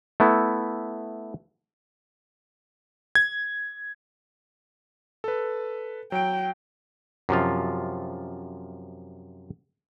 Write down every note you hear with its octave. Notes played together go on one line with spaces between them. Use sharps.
A3 B3 E4
G#6
A4 B4
F#3 G5 D7
F#2 C3 F3 F4